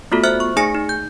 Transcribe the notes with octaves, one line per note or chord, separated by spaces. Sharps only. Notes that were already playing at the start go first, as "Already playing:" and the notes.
A3 B3 F4 F#4 A4
C5 E5 F6 F#6
C#6
A3 D#4 G#4 G#5 A#6 C#7
D#4
G6